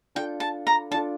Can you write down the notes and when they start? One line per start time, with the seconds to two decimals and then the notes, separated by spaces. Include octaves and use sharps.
0.15 D4 F4 A4 G5
0.40 A5
0.67 A#5
0.91 D4 F4 A4 A5